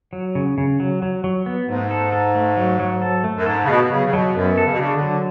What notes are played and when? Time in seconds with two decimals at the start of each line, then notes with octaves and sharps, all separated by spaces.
0.13 F#3
0.35 C#3
0.58 C#3
0.80 F#3
1.02 F#3
1.24 F#3
1.46 B3
1.68 G#2 A3
1.91 A4
2.12 A4
2.35 A3
2.57 F#3
2.79 F#3
3.02 A4
3.24 A3
3.37 F#2
3.46 G#2 A4
3.64 C#3
3.68 B2 B3
3.81 B2
3.90 C#3 F#3
4.05 C#3
4.13 B2 F#3
4.35 F#2 B3
4.57 A4
4.64 C#3
4.72 B2
4.79 C#3 D4
4.95 D3
5.01 F#3